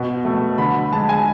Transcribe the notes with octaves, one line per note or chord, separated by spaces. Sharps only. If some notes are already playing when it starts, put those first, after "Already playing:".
Already playing: B2
A3
D3 B5
G#3 A5
G#5